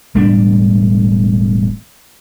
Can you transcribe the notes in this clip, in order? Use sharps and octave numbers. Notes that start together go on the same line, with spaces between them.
E1 A2 G3 D4